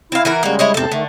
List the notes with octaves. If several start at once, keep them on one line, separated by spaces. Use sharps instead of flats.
C4 E4 F5
E3 F#4 A#4
C#3 G3 G#3 A#3 F#4
E4 C#5 D#5
E2 G#2 C3 C4 A4
D3 D#3 A3